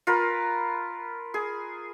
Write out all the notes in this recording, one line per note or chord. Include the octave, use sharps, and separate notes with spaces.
F4 A#4 B4
G#4